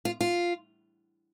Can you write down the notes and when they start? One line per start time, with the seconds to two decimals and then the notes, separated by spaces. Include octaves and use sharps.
0.05 F4
0.21 F4